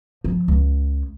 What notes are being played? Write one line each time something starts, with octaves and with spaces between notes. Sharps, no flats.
F3
C#2